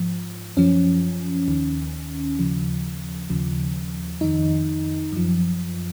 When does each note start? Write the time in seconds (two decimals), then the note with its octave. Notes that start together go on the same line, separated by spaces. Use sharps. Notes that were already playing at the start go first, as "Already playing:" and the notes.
Already playing: G#2 F3
0.57 F#2 F3 C#4
1.48 D#2 D#3
2.39 D#2 C#3 F3
3.30 D#2 C#3 F3
4.21 F2 D#3 D#4
5.12 F#2 F3